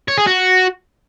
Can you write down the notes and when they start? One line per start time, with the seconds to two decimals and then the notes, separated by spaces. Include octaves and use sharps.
0.08 C#5
0.18 G#4
0.27 F#4